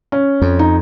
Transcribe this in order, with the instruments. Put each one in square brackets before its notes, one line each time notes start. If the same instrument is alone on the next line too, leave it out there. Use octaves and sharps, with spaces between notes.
[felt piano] C#4
[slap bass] F2
[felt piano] D#4